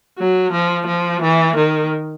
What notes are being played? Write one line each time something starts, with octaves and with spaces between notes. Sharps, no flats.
F#3
F3
F3
E3
D#3